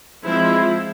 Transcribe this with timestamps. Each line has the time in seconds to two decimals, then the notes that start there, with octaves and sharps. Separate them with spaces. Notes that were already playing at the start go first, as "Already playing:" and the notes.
0.23 F3 G#3 C4 E4